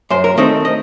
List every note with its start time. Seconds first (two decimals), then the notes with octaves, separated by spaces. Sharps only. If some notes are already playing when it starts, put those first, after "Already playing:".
0.10 F#2 C5
0.24 A#4
0.37 D#3 A3 C4 D#4 D#5
0.65 D#5